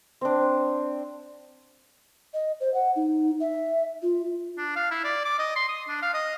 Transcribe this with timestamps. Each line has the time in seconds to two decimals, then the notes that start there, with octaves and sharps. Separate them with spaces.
0.21 C4 D4
2.34 D#5
2.60 C5
2.74 F#5
2.96 D#4
3.41 E5
4.02 F4
4.58 D4
4.76 F5
4.91 E4
5.04 D5
5.25 D6
5.39 D#5
5.56 C6
5.69 D#6
5.89 D4
6.02 F5
6.14 D#5